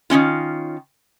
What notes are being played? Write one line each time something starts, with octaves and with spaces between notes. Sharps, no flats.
D#3 C4 C#4 F4